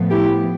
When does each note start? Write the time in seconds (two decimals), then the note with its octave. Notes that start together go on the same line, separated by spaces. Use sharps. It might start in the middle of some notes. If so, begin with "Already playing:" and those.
Already playing: A2 F3 B3
0.10 E4 G4